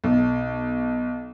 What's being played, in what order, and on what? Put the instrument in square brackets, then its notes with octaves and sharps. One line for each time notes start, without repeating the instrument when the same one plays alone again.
[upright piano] B1